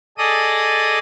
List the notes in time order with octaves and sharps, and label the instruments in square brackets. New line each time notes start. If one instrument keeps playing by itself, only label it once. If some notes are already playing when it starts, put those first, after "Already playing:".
[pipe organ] G#4 A4 D5 D#5 D#6